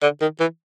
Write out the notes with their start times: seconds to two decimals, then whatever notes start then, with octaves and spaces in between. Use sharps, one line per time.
0.03 D3
0.21 D#3
0.40 E3